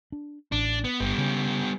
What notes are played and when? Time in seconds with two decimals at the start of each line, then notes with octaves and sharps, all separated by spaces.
0.12 D4
0.52 A1 D4
0.84 B3
1.00 G1 G3 B3
1.18 C#3